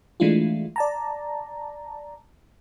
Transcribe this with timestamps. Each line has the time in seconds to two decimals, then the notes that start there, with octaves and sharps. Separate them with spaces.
0.20 E3 G#3 A3 D4 E4 F4
0.76 D5 A5 A#5